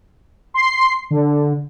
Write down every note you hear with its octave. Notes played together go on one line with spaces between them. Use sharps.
C6 C7
D3